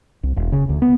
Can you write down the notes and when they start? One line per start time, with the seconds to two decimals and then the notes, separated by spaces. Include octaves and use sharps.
0.23 C2
0.36 E1
0.52 C#3
0.69 D2
0.82 B3